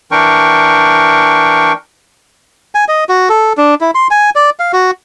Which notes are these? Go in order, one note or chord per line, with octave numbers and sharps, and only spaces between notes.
E3 D4 A#4 G5 C#6
G#5
D#5
F#4
A4
D4
E4
C6
G#5
D5
F5
F#4